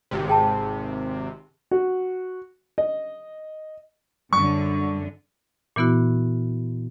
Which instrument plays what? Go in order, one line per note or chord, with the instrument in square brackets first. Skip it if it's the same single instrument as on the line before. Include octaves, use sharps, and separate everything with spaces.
[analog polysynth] G#1 C3
[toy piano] G#4 G5 A5
[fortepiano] F#4
D#5
[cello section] F#2 D3 [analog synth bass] G3 [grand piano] C#6
[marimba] A#2 E3 B3 E4 F#4